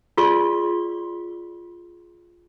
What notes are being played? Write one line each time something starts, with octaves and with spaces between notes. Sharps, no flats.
F4 G#4 D5 C6 C#6